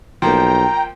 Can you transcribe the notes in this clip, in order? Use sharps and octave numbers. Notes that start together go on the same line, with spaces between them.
B1 F3 A#3 G5 A#5